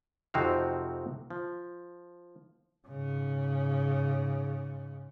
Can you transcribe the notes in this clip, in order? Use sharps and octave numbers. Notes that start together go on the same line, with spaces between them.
F2 C3 C4 D#4 F#4 F5
F3
G#2 C#3